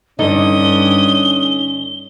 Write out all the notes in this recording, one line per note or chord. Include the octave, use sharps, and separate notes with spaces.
G2 D3 C#4 D#4 D#6 G7